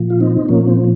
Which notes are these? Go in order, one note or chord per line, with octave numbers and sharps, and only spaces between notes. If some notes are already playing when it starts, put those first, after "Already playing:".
Already playing: A#2 F3
F4
C4 D#4
A#2 F3 A#3 C#4
C4